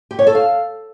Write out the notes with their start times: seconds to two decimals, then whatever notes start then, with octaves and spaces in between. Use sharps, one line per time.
0.11 G4
0.19 C#5
0.27 A4
0.35 F5